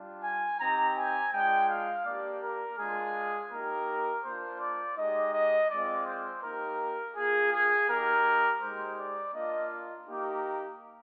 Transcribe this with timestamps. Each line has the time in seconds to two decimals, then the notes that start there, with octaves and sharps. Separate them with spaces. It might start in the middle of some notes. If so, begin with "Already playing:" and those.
Already playing: G3 D4 F4
0.24 G#5
0.60 C4 D#4 G4 A#5
0.97 G#5
1.33 G#3 D4 F4 G5
1.69 F5
2.06 A#3 D4 G4 D5
2.43 A#4
2.78 G#3 D4 F4 G#4
3.52 A#3 D#4 G4 A#4
4.24 A#3 D4 F4 C5
4.61 D5
4.97 G#3 D#4 G4 D#5
5.34 D#5
5.70 G#3 C4 F4 D5
6.07 C5
6.43 A#3 D#4 G4 A#4
7.16 A#3 F4 G#4
7.52 G#4
7.89 A#3 D#4 G4 A#4
8.62 G#3 D#4 G4 C5
8.98 D5
9.34 A#3 D4 F4 D#5
10.07 A#3 D#4 G4